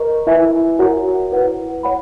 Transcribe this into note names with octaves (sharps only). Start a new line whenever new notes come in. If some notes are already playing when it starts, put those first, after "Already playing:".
Already playing: A#4 D#5 A#5 C#6
E4 B4 E5 G#5
F#4 A#4 C#5 F#5 A#5
E4 B4 F#5
C#5 F#5 B5